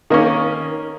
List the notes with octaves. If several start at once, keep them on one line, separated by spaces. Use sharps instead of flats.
D#3 A#3 C#4